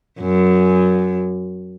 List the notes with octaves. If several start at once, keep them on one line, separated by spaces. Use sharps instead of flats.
F#2